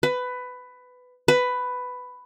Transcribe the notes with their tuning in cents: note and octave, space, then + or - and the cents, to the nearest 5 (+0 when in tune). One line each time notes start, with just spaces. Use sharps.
B4 +15
B4 +10